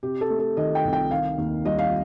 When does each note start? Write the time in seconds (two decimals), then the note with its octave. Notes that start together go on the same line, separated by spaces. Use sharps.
0.03 C3 G4
0.21 A4
0.30 A3
0.39 A4
0.57 D#3 D#5
0.75 G5
0.85 C2
0.93 G5
1.11 D#3 F5
1.38 D#2
1.65 G3 D#5
1.79 F5